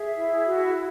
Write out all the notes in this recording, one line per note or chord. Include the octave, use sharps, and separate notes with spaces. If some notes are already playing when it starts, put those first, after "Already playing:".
Already playing: G#4 E5
E4
F#4